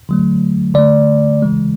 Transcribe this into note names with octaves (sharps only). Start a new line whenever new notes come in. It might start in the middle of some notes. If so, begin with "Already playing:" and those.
D3 F#3 A3
D3 A3 D5
C#3 E3 G#3